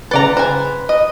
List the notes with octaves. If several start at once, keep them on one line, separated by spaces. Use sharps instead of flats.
C#3 A4 B4 D5 A#5
B4 C5 G#5
D#5